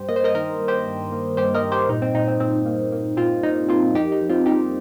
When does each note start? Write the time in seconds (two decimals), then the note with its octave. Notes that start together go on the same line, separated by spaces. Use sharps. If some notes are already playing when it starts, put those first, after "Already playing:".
Already playing: G2 G4 C5
0.08 A#3 D#5
0.16 C5
0.24 A#4 D#5
0.35 D#3 A#4 D#5
0.60 G2
0.68 G4 C5
0.86 G2
1.12 A#3
1.37 G2 G4 C5
1.54 A#4 D#5
1.63 G2
1.72 G4 C5
1.89 A#2 D#4
2.02 C4
2.14 A#2 D#4
2.28 C4
2.40 A#2 C4
2.66 A#3
2.92 A#3
3.17 A#2 C4 F4
3.43 G3 D#4
3.69 A#3 C4 F4
3.95 F2 D#4 G4
4.12 D#4
4.21 F2
4.29 C4 F4
4.46 G3 D#4 G4